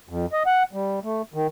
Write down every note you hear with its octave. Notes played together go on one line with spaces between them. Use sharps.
F2
D#5
F#5
G3
A3
D#3